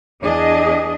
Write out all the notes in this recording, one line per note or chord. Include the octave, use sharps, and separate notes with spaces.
E2 D4 G#4 D#5